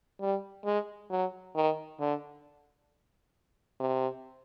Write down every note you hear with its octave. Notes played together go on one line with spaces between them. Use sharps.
G3
G#3
F#3
D#3
D3
C3